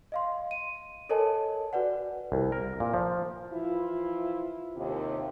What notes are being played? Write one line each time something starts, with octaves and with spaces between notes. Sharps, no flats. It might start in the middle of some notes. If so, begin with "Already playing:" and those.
D#5 F5 C6
D#7
A4 A#4 C#5 D#5 G#5 A5
F#4 B4 D5 F#5
C2
A#4
A#2
F3
E3 F3 E4 F4
D#2 C3